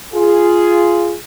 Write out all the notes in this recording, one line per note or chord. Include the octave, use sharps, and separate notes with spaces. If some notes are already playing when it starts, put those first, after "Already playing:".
F4 G#4